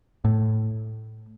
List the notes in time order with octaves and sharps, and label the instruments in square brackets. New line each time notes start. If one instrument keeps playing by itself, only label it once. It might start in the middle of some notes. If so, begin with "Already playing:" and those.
[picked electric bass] A2